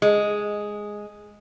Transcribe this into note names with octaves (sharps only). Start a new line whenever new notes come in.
G#3